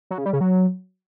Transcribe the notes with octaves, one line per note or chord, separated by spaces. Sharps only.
F#3
C#3
G3
C#3
F#3